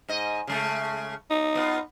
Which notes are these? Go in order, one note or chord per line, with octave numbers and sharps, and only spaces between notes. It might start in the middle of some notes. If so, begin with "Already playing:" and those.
G#2 D#5
C#3 G#3 A3
D#4
B3 F4